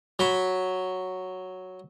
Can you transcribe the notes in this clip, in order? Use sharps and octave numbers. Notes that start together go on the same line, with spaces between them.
F#3 B5